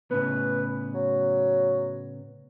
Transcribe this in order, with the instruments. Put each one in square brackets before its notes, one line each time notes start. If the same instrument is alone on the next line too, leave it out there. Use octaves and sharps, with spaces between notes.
[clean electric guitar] A2 C#3 B3 [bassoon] B4
[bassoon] F#3